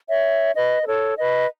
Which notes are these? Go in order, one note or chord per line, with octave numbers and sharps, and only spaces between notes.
C#5 E5
B4 D#5
B4
A4 C#5
B4 D#5